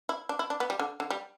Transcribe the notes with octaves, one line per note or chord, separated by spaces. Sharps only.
E4
D4
E4
D4
B3
G3
D3
D3
G3